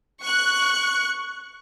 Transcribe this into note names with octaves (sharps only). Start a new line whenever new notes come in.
C#6 F#6